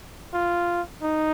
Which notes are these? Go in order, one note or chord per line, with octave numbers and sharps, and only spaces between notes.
F4
D#4